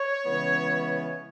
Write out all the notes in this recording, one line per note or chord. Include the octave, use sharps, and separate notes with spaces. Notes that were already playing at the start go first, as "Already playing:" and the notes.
Already playing: C#5
C#3 E3 G#3 B3